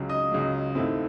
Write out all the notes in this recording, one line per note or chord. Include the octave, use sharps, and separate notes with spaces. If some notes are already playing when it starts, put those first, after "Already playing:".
Already playing: C#2 C#3 F#3
D#5 D#6
C#2 C#3 F#3
D#2 D#3 A3 C4 E4